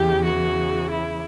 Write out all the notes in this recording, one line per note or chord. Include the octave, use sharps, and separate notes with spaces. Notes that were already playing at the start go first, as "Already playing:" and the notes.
Already playing: E2 C#3 E3 G4
F#4
E4